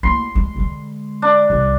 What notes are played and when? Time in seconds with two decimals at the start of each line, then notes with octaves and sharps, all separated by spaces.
0.03 A3 A#3 C6
0.35 G#3
0.56 D3 G#3
1.22 D4
1.50 C2